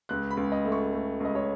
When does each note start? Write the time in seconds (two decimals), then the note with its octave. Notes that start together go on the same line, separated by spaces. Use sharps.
0.09 C#2 F#6
0.30 B5
0.37 C#2
0.52 D#5
0.65 A3
0.72 C#6
0.93 A3
1.20 C#2 D#5
1.35 C#5